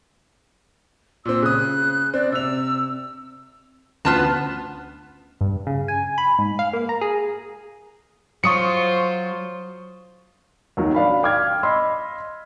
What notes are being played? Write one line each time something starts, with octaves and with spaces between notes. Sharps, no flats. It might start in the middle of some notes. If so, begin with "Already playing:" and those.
A#2 C4 E6
C#3 D#6 F#6
C4 D5
C3 E6 F7
D2 B3 C#4 F4 A5 F6
G2
C#3
G#5
B5
G#2
F5
A#3
A#5
G#4
F#3 F4 C5 C#6 D#6 C#7
D#2 D#3 F#3
D4 F5 B5
F5 G5 D6 F6 G#6
D#5 B5 C6 E6